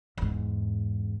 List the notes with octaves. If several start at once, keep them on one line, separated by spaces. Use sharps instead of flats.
E2 G#2